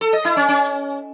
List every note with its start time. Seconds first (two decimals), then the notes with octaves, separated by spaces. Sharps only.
0.01 A4
0.13 D#5
0.25 E4
0.37 C#4
0.48 C#4